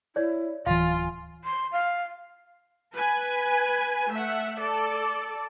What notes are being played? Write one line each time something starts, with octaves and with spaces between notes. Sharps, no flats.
E4 C#5 D5
D1 E3 F4 F5 G#5
C6
F5
B4 G#5
A3 E5 F#5
A4 D5